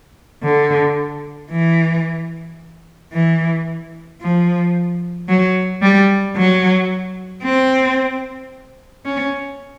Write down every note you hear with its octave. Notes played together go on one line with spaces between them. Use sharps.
D3
E3
E3
F3
F#3
G3
F#3
C4
C#4